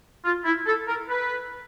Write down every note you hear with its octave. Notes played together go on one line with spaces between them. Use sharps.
F4
E4
A4
A#4
B4